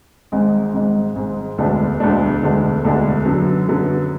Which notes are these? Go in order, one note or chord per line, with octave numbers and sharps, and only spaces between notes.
G#1 G#2 G#3
G#1 G#2 G#3
G#1 G#2 G#3
E1 D2 D3 G#3 D4
E1 D2 D3 G#3 D4
E1 D2 D3 G#3 D4
E1 D2 D3 G#3 D4
F#2 D3 F#3 B3
F#2 D3 F#3 B3